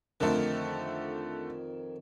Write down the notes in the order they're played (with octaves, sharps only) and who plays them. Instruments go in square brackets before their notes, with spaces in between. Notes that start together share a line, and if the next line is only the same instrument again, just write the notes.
[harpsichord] F2 D#3 [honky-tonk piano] D3 A3